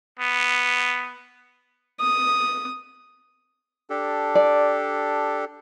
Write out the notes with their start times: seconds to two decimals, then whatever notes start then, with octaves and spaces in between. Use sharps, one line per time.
0.19 B3
2.00 D#6
3.90 D4 G4 A4
4.35 D5